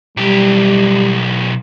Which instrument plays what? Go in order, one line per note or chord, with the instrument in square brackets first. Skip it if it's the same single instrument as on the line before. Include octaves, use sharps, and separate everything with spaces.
[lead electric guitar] B1 G4 [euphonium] G3